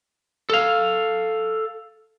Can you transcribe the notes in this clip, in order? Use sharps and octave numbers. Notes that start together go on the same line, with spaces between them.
A4 F5